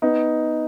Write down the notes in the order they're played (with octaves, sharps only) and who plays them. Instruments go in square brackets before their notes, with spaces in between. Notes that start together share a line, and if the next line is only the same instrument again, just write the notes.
[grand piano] B3 D#4